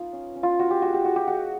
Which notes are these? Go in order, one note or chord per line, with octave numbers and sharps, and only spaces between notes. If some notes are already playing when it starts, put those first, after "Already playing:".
Already playing: B3 D#4 F4
C#4
C#4
F4
F4 F#4
G4
G#3 F#4
G4
G#3 F#4
G4
G#3 F#4